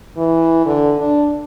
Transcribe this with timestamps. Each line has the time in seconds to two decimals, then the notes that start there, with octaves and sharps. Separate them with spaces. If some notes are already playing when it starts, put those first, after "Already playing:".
0.17 E3
0.66 D3
0.99 D4